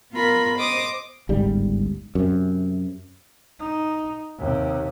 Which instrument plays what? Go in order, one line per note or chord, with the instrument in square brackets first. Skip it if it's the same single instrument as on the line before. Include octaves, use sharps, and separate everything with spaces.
[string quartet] B3 F4 A#4 B5
C5 D#5 D6 D#6
[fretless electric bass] G1 C#2 G#2 G3
F#2 C3
[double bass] D#4
D#2 C3